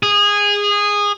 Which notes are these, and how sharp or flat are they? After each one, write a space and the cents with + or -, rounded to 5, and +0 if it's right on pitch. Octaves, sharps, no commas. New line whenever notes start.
G#4 -15